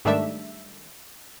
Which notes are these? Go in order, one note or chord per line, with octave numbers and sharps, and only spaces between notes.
G#2 D#3 G3 A3 D4 E5